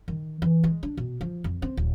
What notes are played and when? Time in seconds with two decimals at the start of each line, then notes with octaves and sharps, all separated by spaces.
0.08 D#3
0.42 E3
0.64 G#3
0.83 D4
0.97 B2
1.21 F3
1.44 F2
1.62 C4
1.77 D1